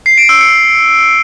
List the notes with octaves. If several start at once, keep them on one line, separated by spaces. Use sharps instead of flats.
C7
D7
E6
C#7